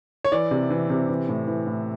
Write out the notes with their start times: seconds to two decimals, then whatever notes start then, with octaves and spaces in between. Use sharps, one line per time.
0.24 C#5
0.32 E3 D5
0.51 C3
0.71 E3
0.90 C3
1.09 E3
1.28 A2
1.47 E3
1.67 A2